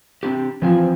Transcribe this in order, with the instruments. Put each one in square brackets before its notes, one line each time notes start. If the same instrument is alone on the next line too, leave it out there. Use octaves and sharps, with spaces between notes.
[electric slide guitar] C4 D4 G4
[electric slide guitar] E3 C4 G#5 [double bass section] F3